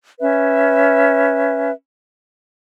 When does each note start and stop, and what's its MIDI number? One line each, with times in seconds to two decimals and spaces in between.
0.20 1.71 61
0.20 1.71 71
0.20 1.71 76